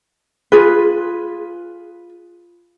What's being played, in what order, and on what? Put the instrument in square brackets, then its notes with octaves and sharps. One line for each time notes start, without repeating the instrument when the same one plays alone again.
[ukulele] F4 G#4 B4